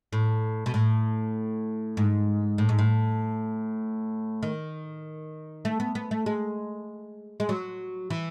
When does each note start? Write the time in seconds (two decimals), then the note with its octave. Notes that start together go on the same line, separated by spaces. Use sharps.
0.13 A2
0.66 B2
0.74 A2
1.97 G#2
2.58 A2
2.69 G#2
2.79 A2
4.43 D#3
5.65 A3
5.80 B3
5.95 B3
6.11 A3
6.26 G#3
7.40 G#3
7.49 F#3
8.10 E3